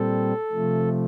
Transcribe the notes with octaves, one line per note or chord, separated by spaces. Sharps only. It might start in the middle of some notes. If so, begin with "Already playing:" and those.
Already playing: A#2 G3 C4 A4
C3 F3 A3